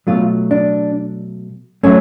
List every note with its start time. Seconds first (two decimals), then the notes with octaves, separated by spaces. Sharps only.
0.07 B2 F#3 A3 F4
0.51 D4
1.83 F#3 A3 C#4